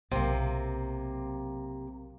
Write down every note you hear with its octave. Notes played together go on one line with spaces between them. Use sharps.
B1 C3 F#3 A#3